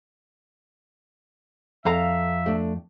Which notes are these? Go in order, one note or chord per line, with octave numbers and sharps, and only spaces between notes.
F2 A4 E5 F5 A#5
A3 D4